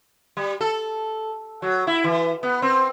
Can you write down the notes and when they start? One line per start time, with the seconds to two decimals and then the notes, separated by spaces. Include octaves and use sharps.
0.37 G3
0.61 A4
1.62 F#3
1.87 E4
2.04 E3
2.43 B3
2.62 C4